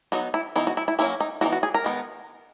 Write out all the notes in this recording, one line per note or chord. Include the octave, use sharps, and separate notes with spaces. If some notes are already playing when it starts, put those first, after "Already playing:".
F#3 B3 D#4 F#4
E4
E3 B3 D#4 E4
F#4
E4
E4
F#3 A#3 C#4 E4
D#4
E3 B3 D#4 F#4
F#4
G#4
A#4
D#3 G#3 B3 D#4